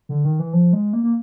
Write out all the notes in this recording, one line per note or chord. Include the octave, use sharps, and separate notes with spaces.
D3
D#3
E3
F3
G#3
A#3
A#3